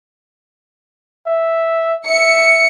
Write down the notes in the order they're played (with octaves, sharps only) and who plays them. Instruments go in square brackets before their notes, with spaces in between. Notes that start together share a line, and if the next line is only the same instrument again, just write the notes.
[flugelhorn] E5
[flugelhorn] E5 [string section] C#7